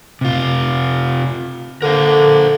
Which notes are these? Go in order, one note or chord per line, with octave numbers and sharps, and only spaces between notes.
C3 F4
D3 A#4 C5 F5